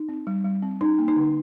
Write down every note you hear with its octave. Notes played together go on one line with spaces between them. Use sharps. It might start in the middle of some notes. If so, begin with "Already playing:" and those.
Already playing: D#4
C4
G3
G3
C4
C#4 D#4
A#3
D#4
D3